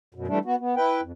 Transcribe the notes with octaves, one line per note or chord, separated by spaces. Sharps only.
F#2 B2
E3 G3 A3 D4
B3 F#4
B3
E4 B4 G5
F2